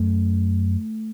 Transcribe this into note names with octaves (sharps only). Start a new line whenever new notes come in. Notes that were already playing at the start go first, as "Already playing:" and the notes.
Already playing: F#2 A3